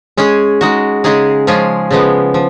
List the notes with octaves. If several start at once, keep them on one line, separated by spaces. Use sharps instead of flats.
G#3 C#4 G#4
G#3 D#4 F#4
C#3 G#3 D#4 G#4
F3 G#3 C#4 F4 G#4
C#3 F3 G#3 B3
F3